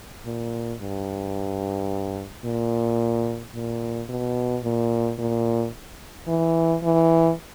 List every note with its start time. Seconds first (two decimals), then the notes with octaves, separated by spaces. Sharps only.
0.25 A#2
0.81 G2
2.45 A#2
3.55 A#2
4.09 B2
4.64 A#2
5.18 A#2
6.28 E3
6.83 E3